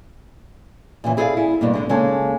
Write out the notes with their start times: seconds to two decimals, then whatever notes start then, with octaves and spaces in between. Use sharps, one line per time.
1.04 A#2 C#3 E3
1.17 E4 G#4 A4 C5 D5 F5
1.37 E4
1.61 G2 B2 A#3
1.74 D3 G#3 D4
1.89 C#3 G#3 A#3 D#4 A4